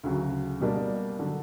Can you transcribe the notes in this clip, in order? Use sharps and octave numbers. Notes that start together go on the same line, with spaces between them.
D2 C#3 F#3
B2 G3 A#3 D4
D3 F#3